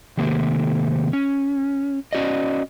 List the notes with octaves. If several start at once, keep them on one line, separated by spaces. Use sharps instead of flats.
C3 D#3 A3 A#3 G4
C#4
C#4 F#4 D5 D#5